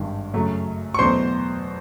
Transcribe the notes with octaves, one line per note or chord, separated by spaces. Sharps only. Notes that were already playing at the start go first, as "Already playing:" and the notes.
Already playing: G#1 G2 D#3
F#2 C#3 F#3 A3
C#6
E2 B2 F#3 A3 C5 C6